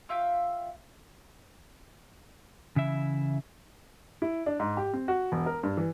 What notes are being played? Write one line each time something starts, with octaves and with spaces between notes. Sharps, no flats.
F4 E5 F5 G5
C#3 E3 E4 E5
E4
D4
G#2
G4
C4
F#4
E1
A#4
G2
E3